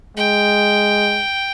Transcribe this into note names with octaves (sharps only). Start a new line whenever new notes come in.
G#3 G5